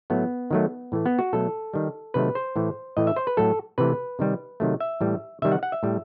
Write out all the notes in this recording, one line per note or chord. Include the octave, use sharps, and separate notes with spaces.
A2 F#3 A3 B3
D#3 F#3 A3
A2 E3 A3
B3
F#4
B2 F#3 A3 A4
D#3 G3
C3 D#3 F#3 A3 B4
C5
A2 E3 A3
A2 E3 A3 D#5
E5
C5
B4
A2 F#3 A3 A4
C3 E3 A3 B4
C3 D#3 G3
C3 D#3 F#3 A3
E5
A2 E3 G3
C3 D#3 G3 E5
F#5
F#5
E5
A2 G3